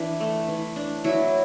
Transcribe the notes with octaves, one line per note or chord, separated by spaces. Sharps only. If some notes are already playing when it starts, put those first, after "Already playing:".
Already playing: E3 D4
A3
E3
D4
F#3 E4